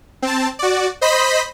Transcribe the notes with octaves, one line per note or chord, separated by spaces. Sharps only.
C4 A5
F#4 D5
C5 D#5 B5 B6